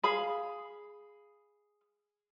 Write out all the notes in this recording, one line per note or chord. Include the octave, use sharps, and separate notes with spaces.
G#4 F5 B5